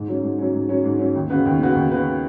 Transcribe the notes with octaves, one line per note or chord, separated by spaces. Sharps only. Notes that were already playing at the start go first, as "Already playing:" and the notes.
Already playing: G#2
F#3 C#4
G#2
F#3 C#4
G#2
F#3 C#4
G#2
F#3 C#4
D#2
C#3 B3 F#4 B4
D#2
C#3 B3 F#4 B4
D#2
C#3 B3 F#4 B4